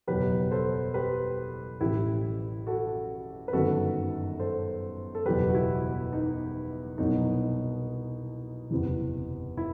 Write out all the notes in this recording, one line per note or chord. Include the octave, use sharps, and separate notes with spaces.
F#1 E2 B2 F#3 G4 B4
A4 C5
G4 B4
A1 A2 E3 E4 G4
F#4 A4
B4
G1 F#2 D#3 F#4 A4
A4 C5
A4
F#1 E2 B2 F#3 G4 B4
F#4
E4
D#4
C2 B2 F#3 D#4
F#1 E2 C3 E3
E4